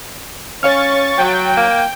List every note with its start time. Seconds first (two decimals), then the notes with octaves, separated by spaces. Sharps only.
0.63 C#4 C#5 F5 C#6 F6 A6
1.18 F#3 G5
1.57 A#3